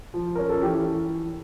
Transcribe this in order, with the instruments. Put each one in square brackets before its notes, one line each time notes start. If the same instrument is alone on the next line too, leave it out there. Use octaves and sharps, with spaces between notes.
[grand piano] F3
C#4 A#4
A4
E3 G4